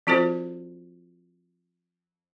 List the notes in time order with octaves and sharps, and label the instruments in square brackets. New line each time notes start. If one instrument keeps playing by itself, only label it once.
[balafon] F3 C4 F4 F#4 A4 C5